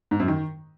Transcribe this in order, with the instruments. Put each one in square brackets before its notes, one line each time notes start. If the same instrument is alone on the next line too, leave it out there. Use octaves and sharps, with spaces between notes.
[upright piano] G#2
F#2
D#3